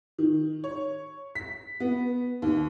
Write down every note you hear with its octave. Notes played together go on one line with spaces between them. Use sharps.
D#3
C#5
B6
B3
D#2